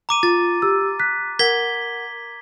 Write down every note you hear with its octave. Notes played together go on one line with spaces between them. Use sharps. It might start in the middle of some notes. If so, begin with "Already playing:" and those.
A#5 D6 D#7
F4 A6
G4 E6
F#6 B6
A#4 F#5 G#6 B6 G7